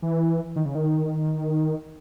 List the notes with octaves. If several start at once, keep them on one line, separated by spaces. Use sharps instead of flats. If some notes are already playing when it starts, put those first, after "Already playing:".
E3
D#3
C#3
D#3